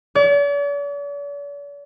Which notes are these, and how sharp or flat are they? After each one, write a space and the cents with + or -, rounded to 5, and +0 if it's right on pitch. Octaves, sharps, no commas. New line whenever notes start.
D5 -45